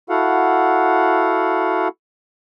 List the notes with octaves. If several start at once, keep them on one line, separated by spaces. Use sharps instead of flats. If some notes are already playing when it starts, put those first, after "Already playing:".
E4 F#4 A4 F5 F#5